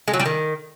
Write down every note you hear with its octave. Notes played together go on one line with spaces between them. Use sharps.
G#3
F#3
G3
D#3